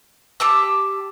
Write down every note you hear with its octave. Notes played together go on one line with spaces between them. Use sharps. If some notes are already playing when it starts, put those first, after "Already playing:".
G4 A5 E6